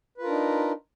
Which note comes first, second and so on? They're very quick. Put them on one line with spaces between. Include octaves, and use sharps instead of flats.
B4 F4 A#4 D4 D#4